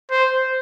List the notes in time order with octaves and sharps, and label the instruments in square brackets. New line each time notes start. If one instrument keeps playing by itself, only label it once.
[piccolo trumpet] C5